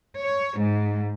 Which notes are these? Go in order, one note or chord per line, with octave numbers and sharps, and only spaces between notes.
C#5
G#2